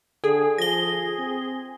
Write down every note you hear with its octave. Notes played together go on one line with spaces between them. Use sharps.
D3 G#4 A4
F3 A#6 G7
C4